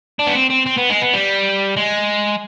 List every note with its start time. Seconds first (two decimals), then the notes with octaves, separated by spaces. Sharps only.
0.19 D4
0.27 B3
0.35 C4
0.50 C4
0.67 C4
0.78 B3
0.90 G#3
1.02 B3
1.13 G3
1.77 G#3